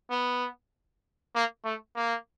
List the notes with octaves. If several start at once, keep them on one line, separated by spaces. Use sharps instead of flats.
B3
A#3
A3
A#3